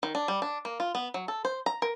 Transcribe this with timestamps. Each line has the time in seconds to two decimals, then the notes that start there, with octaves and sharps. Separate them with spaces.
0.03 D#3
0.15 D4
0.28 G3
0.42 D4
0.65 A#3
0.80 F4
0.95 B3
1.14 F#3
1.28 A4
1.45 C5
1.66 A#5
1.82 A#4